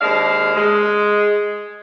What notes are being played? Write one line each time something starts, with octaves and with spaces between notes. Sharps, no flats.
D#2 G#3 D4 C5 F5
G#3